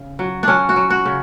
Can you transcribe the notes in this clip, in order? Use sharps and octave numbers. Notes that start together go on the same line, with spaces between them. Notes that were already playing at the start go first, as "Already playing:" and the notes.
Already playing: C#3
F#3
F#3 C#4 D4
F#4
F#3
F#4
C#3